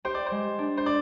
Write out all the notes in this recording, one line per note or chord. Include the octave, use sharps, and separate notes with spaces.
G4 C5
D5
G#3 C5
D4
C5
D5